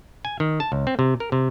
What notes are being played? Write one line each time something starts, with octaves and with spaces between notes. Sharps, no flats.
G#5
D#3
A5
C#2
C4
C3
A#4
C3